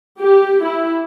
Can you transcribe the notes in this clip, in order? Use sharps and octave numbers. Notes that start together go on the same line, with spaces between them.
G4
E4